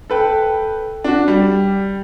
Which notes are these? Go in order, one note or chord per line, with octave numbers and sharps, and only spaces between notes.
A4 B4 G5
D4 F#4
G3